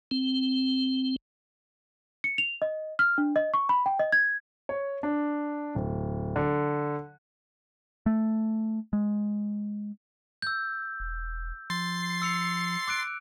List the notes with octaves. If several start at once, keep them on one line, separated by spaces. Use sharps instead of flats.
C4
C#7
F7
D#5
F6
D4
D#5
C#6
B5
G5
D#5
G#6
C#5
D4
D1
D3
A3
G#3
E6 G6
E1
F3 C6 A6 C7
E6 C#7 F7
D6 F#6 D7